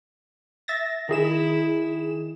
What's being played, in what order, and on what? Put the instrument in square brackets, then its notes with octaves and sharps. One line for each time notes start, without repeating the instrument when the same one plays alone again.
[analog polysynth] E5 A6 A#6
[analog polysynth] D#3 G#4 E7 [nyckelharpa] E4